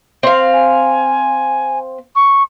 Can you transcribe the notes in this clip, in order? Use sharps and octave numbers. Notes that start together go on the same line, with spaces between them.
C4 F5
G#5
C#6